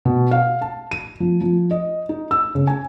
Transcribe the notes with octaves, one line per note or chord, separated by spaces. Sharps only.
B2
F5
A5
D#7
F3
F3
D#5
D#4
E6
C#3
G#5